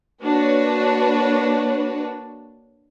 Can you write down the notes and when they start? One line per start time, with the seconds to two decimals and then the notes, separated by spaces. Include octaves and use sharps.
0.22 A#3 D4 F#4 B4 C#5